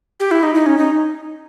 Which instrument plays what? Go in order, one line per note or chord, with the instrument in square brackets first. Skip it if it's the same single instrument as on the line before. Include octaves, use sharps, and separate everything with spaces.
[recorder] G4
E4
D#4
D#4
C#4
D#4